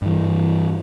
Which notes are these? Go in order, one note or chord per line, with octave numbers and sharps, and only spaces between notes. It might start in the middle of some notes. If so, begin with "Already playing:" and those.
G2 E3